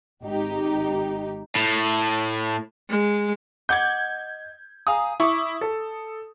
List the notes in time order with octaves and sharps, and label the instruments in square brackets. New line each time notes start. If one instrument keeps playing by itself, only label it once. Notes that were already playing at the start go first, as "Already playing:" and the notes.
[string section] G#1 D#4 G4
[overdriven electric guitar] A2
[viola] G#3
[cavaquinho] D#5 F#5 D6 [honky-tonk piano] G6 G#6
[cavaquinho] G#4 F5 A#5 [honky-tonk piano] D#6
[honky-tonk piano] E4 [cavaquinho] C#6 D6
[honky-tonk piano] A4